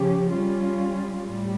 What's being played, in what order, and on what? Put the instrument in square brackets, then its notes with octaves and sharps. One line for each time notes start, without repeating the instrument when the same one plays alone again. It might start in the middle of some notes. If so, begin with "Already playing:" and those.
Already playing: [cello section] C#3 F3 C#4 G4
G3 C#4 F4
A2 G3